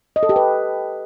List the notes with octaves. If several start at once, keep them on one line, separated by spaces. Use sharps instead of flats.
D#5
A4
G4
B4